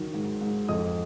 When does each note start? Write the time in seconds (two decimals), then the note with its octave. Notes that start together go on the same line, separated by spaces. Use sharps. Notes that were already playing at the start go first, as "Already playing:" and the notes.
Already playing: D#3 F#3
0.14 G#2
0.41 G#2
0.68 F2 D#5 D#6